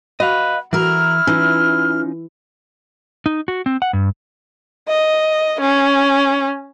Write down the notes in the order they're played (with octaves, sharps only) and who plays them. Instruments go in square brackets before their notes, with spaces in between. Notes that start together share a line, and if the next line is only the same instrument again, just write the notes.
[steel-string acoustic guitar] F#4 [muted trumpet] B4 [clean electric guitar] D#5 F5
[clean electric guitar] E3 [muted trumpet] E4 [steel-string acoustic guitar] F#4 A#4 [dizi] F6
[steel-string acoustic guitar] E3 [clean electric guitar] C#4 D#4 F4
[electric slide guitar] D#4
F#4
C4
F#5
G2
[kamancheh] D#5
C#4